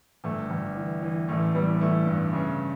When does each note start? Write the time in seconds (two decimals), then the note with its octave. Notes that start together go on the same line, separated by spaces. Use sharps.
0.24 G1 A3
0.50 G1
0.76 E3
1.02 E3
1.28 A1 A3
1.55 E3 G3 B3
1.81 E3 A3
2.07 G2
2.33 C#3